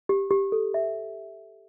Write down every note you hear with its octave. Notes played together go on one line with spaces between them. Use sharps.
G4
G4
A4
E5